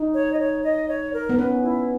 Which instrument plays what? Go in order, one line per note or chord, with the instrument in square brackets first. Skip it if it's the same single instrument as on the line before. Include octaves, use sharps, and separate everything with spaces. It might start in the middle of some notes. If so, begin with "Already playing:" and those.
Already playing: [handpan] D#4
[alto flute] C#5
D#5
C#5
D#5
C#5
A#4
[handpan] B3
[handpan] C#4 [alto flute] B4
[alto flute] E4